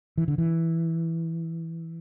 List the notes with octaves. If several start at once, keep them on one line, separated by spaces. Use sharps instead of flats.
E3
D3
E3